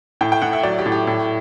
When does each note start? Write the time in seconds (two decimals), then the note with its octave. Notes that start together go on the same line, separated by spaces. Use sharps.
0.21 A2 G5
0.32 G5
0.42 A2 F#5
0.53 E5
0.63 F#3 D5
0.79 G4
0.86 A2
0.92 G4
1.07 A2